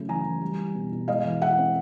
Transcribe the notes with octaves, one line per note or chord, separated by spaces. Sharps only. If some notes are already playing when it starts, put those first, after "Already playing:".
Already playing: C#3 F#3 A3
E3 G#5 A#5
E3
G3
G3
B2
B2
G#3 D#5 F5
E3
G#3 E5 F#5
C4